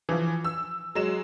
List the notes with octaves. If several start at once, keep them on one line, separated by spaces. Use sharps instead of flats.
E3 F3
E6
F#3 G#3 E7